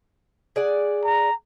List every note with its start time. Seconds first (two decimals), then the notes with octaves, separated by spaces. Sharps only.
0.56 G#4 D5 F#5
1.05 A#5